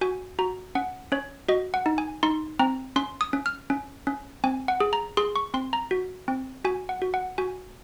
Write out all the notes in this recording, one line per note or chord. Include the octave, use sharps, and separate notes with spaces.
F#4 G#5
F#4 A#5
C#4 F#5
C#4 C#5
F#4 D#5
F#5
D#4
G#5
D#4 C6
C4 A#5
C#4 C6
D#6
C#4
F6
C#4
C#4
C4 G#5
F#5
G#4
A#5
G#4 C6
C#6
C4 C6
A#5
F#4
C4
F#4 G#5
F#5
F#4
F#5
F#4 G#5